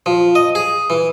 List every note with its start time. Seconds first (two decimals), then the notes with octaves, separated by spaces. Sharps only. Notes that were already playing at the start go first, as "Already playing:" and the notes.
0.06 F3
0.35 D#5
0.55 G#4
0.90 E3